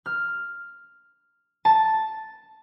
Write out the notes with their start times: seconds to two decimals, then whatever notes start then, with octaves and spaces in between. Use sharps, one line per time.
0.06 F6
1.65 A5